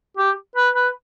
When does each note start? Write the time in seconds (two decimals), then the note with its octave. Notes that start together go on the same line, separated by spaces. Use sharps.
0.17 G4
0.56 B4
0.75 B4